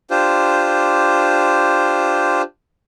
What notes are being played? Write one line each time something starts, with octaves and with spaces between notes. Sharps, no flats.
D4 F4 G4 C5